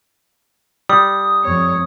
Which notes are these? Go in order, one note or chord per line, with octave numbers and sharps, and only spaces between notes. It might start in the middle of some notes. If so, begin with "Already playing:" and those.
G3 D#6
F2 C#5